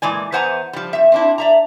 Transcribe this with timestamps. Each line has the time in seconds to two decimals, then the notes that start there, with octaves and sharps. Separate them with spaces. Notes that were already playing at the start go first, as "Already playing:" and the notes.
0.02 A#2 E3 G#3 D5 G#5
0.32 E2 B4 C5 F#5 G#5 A#5
0.73 F3 G3
0.93 F2 E5
1.12 C4 D4 E4
1.38 D5 E5 A#5